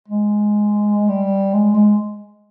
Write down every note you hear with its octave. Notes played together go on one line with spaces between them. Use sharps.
G#3
G3
G#3
G#3